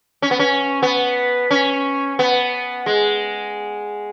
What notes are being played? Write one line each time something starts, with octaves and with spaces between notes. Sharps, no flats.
C#4
B3
C#4
B3
C#4
B3
G#3